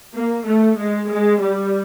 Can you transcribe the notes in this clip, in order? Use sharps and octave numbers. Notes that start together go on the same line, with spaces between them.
A#3
A3
G#3
G#3
G3